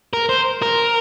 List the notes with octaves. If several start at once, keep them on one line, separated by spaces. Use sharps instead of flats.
A#4
C5
A#4